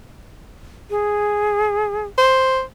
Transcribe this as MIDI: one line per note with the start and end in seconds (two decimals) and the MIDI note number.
0.90 2.07 68
2.18 2.62 72